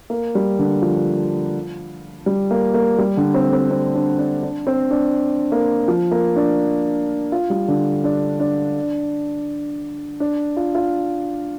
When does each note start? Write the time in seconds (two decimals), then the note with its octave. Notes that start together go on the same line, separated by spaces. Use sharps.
0.10 A#3
0.35 G3
0.59 D3
0.82 F3
2.26 G3
2.51 A#3
2.74 A#3
2.98 G3
3.17 D3
3.34 C4
3.53 C4
3.71 C4
3.95 D4
4.19 D4
4.43 D4
4.67 C4
4.91 D4
5.52 A#3
5.88 F3
6.12 A#3
6.36 D4
7.32 F4
7.50 G3
7.68 D3
8.04 D4
8.40 D4
10.20 D4
10.57 F4
10.75 F4